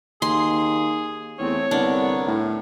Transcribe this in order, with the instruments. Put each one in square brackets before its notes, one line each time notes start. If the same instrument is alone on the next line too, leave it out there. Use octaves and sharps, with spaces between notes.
[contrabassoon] D#2 [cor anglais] G#4 [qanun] C6
[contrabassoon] E2 [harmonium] A3 C4 [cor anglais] C#5
[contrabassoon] C2 [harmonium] D3 B3 A#4 [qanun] D4
[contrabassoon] A2